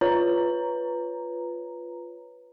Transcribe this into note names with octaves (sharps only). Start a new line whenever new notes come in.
F4 B4 C#5 A#5